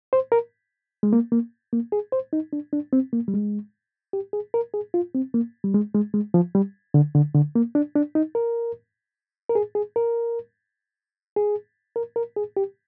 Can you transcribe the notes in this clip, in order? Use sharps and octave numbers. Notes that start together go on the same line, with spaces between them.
C5
A#4
G#3
A#3
A#3
A#3
G#4
C5
D#4
D4
D4
C4
A#3
G3
G#3
G4
G#4
A#4
G#4
F4
C4
A#3
G3
G#3
G#3
G#3
F3
G3
D3
D3
D3
A#3
D4
D4
D#4
A#4
A#4
G#4
G#4
A#4
G#4
A#4
A#4
G#4
G4